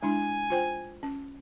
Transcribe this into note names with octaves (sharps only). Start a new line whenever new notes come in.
G#3 D4 E4 G#5
F4 C5 G5
C#4